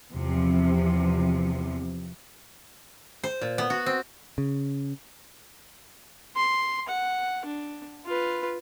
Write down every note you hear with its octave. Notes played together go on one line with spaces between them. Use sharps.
E2 C3 F3
C5
A#2
B3
F#4
C4
C#3
C6
F#5
D4
F4 B4